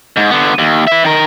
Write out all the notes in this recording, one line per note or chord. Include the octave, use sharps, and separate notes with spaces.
G#2
D3 B3
D#2
B4 E5
D#3 A#4